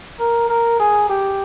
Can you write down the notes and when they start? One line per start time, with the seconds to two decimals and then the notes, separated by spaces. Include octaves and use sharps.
0.19 A#4
0.49 A#4
0.79 G#4
1.10 G4